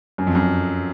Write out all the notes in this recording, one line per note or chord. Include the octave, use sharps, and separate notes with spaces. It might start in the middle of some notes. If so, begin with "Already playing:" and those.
F#2
F2
F#2